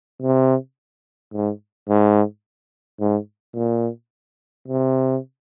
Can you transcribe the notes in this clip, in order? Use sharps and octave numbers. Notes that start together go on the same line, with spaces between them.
C3
G#2
G#2
G#2
A#2
C3